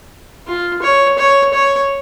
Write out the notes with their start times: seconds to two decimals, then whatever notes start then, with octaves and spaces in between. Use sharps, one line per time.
0.48 F4
0.82 C#5
1.18 C#5
1.53 C#5